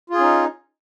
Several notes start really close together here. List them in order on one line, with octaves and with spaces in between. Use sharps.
F4 G#4 C#4 D#4